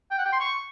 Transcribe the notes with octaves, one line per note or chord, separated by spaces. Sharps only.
G5
F#5
G5
C6
C#6